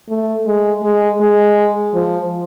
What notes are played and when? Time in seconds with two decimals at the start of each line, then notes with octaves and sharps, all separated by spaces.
0.09 A3
0.46 G#3
0.83 G#3
1.20 G#3
1.94 F3